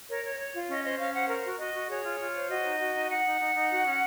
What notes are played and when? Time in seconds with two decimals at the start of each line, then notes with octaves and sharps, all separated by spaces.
0.09 A#4 C#5
0.25 C#5
0.39 C#5
0.54 F4
0.69 C#4 D#5
0.84 C5 D#5
0.99 C#4 F5
1.14 C5 F#5
1.29 A#4
1.45 F#4
1.59 F#4 D#5
1.74 F#4
1.89 G#4 C#5
2.04 F4
2.19 F4
2.35 C5
2.49 F#4 D#5
2.64 D#4
2.80 F#4
2.95 D#4
3.09 D#4 F#5
3.25 D#4
3.40 D#4
3.55 D#4
3.71 F#4
3.86 C#4